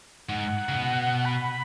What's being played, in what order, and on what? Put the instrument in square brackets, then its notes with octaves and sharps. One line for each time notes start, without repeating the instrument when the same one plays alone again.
[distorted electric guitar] G#2 [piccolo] F#5
[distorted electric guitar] C#3
B2
[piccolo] B5